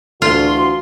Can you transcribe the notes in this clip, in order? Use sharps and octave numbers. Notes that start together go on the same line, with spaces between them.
D2 D3 E3 F4 F#4 C6